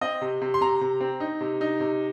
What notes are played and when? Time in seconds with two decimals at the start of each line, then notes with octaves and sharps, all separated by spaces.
0.01 C4 D#5
0.21 C3
0.42 C3
0.54 C6
0.61 C3 A#5
0.81 C3
1.01 C4
1.20 D#4
1.41 C3
1.61 D#4
1.80 C3